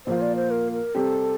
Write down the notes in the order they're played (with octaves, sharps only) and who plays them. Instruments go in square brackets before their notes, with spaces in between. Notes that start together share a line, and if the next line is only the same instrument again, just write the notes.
[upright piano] A#2 F3 A#3 F4 [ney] C5
[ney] D5
C5
A#4
A#4
[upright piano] C3 G3 C4 G4 [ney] A4